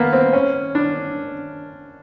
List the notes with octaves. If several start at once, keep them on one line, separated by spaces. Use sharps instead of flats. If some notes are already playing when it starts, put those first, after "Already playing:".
Already playing: A#3 B3
C4
C#4
D4